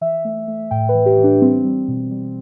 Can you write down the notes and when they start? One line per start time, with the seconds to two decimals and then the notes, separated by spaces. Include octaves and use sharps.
0.01 E3 E5
0.25 A3
0.48 A3
0.71 A2 G5
0.89 B4
0.94 E3
1.06 G4
1.18 E3
1.24 D4
1.41 G3 C4
1.65 G3
1.88 B2
2.11 G3